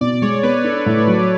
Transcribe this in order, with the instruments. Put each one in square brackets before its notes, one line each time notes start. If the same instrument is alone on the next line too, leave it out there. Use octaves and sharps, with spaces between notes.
[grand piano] B2 [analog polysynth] D5
[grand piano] G#3 [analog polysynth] C#5
[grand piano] B3 [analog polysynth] B4
[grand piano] D4 [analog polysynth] A4
[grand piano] A2
F#3